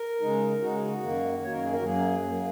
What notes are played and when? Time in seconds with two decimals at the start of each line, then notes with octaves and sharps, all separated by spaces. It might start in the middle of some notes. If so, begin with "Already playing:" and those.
Already playing: A#4
0.20 C#3 G#3 D#4
0.61 C#3 G#3 D#4 F#4
0.75 G#4
0.88 F#4
1.02 F#2 D#3 A#3
1.43 F#2 D#3 A#3 C#5
1.52 A#4
1.63 G#4
1.73 A#4
1.79 F#4
1.83 F#2 F#3 A#3 G#4
2.24 F#2 F#3 A#3